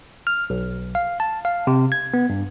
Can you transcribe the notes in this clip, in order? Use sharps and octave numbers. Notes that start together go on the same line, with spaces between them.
F6
B1
F5
A5
F5
C3
G#6
B3
G2